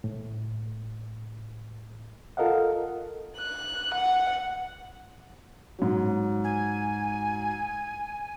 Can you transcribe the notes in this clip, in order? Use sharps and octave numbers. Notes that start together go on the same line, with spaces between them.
A2
F4 A4 A#4 D#5 F5 F#5
F#6
F#5
G#2 F#3
G#5